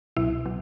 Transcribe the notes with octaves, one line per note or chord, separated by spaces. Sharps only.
C2 B2 F#3 E4
B2 F#3